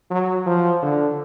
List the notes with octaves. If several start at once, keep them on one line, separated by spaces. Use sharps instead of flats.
F#3
F3
D3